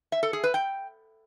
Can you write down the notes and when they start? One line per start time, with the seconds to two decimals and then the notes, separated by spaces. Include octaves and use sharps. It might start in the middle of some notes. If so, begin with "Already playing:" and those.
0.12 E5
0.23 A4
0.33 G#4
0.44 B4
0.54 G5